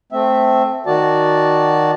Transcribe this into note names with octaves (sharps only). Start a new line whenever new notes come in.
A3 C4 E5
D#3 F#4 D5 A5